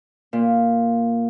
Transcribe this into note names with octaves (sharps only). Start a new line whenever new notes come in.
A#2